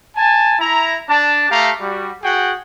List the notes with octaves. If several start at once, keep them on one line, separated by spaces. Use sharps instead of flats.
G#5 A5
E4 A#5
D4 A5
A3 G4 F5 A#5
G3 F#4
F#4 G#4 F#5 G5